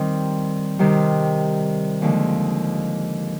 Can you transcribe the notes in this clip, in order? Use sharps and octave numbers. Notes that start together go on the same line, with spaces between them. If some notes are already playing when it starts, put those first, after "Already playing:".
Already playing: D#3 G3 C4 D#4
C3 D#3 G3
D#2 D3 F3 G#3